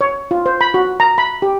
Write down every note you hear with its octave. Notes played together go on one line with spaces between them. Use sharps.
C#5
F4
C5
B5
F#4
A#5
B5
G4